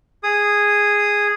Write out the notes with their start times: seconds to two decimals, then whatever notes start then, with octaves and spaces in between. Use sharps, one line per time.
0.23 G#4 D#6